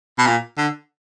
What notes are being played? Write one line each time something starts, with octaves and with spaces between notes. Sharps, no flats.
B2
A#2
D3